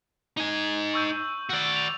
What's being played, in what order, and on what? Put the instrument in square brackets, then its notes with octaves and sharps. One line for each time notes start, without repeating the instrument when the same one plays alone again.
[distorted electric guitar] D#4 G#5
[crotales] C#6 E6 G6
[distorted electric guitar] F#4 D5
[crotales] F7